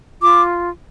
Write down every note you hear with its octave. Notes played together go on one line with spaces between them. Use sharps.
F4 D6